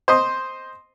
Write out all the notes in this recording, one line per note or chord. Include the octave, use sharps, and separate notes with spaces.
C5 D#5 C6